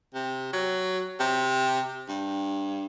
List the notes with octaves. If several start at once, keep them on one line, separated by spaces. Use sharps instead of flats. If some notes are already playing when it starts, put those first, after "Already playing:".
C3
F#3
C3
G2